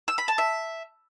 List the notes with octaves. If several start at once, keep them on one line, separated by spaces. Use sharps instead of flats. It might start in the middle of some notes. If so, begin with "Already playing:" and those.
E6
B5
A5
E5